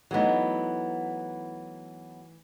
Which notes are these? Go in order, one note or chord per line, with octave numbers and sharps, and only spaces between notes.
E3 F#3 A3 B3 D#4